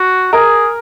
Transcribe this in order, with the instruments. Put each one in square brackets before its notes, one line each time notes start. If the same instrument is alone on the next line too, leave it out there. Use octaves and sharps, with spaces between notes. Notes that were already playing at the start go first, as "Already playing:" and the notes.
Already playing: [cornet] F#4
[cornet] G#4 [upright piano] A#4